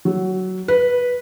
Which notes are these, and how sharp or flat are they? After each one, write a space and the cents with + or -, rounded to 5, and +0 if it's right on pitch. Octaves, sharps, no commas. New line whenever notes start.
F#3 +10
B4 -10